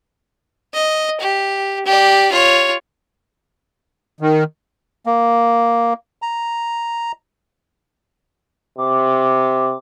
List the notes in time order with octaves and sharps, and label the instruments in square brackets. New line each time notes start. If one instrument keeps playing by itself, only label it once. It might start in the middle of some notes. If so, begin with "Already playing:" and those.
[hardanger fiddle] D#5
G4
G4 D5
F4 C#5
[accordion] D#3
[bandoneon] A#3
A#5
[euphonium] C3 [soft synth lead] D6